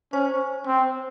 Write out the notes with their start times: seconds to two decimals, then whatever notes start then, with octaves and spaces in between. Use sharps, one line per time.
0.12 C#4 C5
0.66 C4